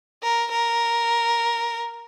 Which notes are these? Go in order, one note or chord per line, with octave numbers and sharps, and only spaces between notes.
A#4
A#4